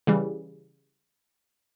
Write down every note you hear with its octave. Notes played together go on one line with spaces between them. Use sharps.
C#3 E3 G3